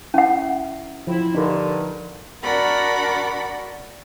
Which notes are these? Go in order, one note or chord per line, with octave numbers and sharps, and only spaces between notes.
C#4 E4 F#5
F3 C4 E4
G2 D3 D#4 A#4
D4 F#4 A#4 D5 F#5 B5